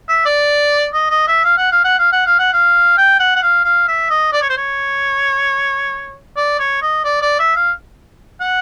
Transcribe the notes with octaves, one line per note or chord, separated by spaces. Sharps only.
E5
D5
D#5
D#5
E5
F5
F#5
F5
F#5
F5
F#5
F5
F#5
F5
G5
F#5
F#5
F5
F5
E5
D#5
D5
C#5
C5
C#5
D5
C#5
D#5
D5
D5
E5
F5
F#5